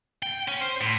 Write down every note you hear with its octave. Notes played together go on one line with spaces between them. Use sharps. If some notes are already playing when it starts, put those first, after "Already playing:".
G5
C#4
C5
A2